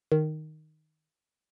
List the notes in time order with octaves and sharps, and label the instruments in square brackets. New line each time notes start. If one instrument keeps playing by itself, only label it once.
[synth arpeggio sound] D#3